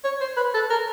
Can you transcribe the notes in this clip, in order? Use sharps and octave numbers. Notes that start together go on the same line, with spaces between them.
C#5
C5
B4
A4
A#4